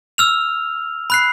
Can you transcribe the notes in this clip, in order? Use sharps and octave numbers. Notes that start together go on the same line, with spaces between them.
E6 F6 F7
B5 F#6 C7